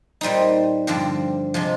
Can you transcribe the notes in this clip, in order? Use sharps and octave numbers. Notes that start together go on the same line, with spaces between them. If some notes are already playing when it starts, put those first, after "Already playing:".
A#2 G3 C4 D#4
G2 D3 F3 C4
C3 F3 G#3